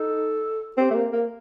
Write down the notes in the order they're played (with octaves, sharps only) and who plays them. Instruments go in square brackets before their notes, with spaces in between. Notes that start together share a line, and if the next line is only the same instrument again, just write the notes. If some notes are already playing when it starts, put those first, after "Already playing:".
Already playing: [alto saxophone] D#4 [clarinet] A4
[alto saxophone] C4 [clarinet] G4
[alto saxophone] A3
A#3
A#3